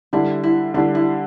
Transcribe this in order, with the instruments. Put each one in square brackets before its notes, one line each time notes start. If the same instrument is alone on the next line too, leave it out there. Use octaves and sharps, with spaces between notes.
[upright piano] D3 G3 D4 [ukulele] E4
[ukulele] E4
[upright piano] D3 G3 D4 [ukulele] E4
[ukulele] E4